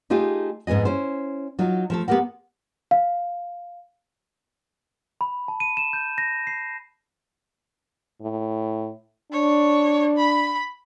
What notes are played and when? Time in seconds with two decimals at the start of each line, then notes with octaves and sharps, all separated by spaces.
0.10 A3 D#4 F4 G4 G#4
0.67 F2 G#2 B3 G#4 D#5
0.85 C#4 E4 C5
1.59 F#3 D#4 F4
1.90 F3 A3 A4
2.08 B3 C4 G4 A#4 F#5
2.91 F5
5.21 B5
5.48 A5
5.60 D#7
5.77 E7
5.93 G6
6.18 A#6
6.47 C7
8.22 A2
9.32 D4 C#5
10.17 B5